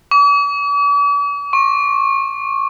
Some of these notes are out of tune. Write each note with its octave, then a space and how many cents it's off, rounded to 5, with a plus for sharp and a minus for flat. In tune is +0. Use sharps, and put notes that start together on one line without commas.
D6 -45
C#6 -30